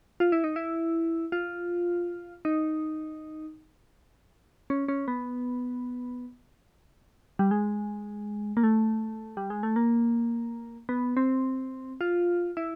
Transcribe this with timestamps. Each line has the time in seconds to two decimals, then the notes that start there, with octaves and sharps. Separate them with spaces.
0.20 F4
0.32 E4
0.44 D#4
0.56 E4
1.32 F4
2.45 D#4
4.70 C#4
4.88 C#4
5.08 B3
7.39 G3
7.51 G#3
8.57 A#3
8.63 A3
9.37 G3
9.50 G#3
9.63 A3
9.76 A#3
10.89 B3
11.17 C4
12.01 F4
12.57 E4